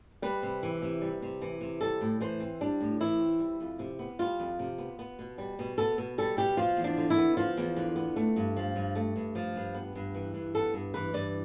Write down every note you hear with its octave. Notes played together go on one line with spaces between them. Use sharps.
G3 B4
C3
E3
C3
G3
C3
E3
C3
G3 A4
A2
E3 C5
C4
G3 D4
A2
E3 E4
C4
G3
F2
C3
B3
G3 F4
F2
C3
B3
B3
B2
G3
B2
B3 A4
B2
G3 A4
B2 G4
F3 F4
E2
D4
D3
E4
B3
F3 F4
E2
D3
B3
A3
G2
F3
G2
A3
G2
F3
G2
B3
G2
E3
G2
B3 A4
G2
E3 B4
G2 D5